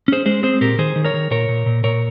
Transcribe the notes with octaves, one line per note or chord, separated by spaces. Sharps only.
C#4 G#4 C5
G#3 G#4 C5
C4 G#4 C5
A#2 G4 A#4
D#3 G#4 C5
D#3
A#4 C#5
D#3
A#2 A#4 C#5
A#2
A#2
A#2 A#4 C#5